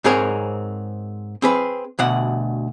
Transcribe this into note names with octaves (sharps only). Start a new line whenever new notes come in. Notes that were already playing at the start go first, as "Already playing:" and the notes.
G#2 C4 G#4 A#4 C#5
C4 G#4 B4
D2 B2 F#5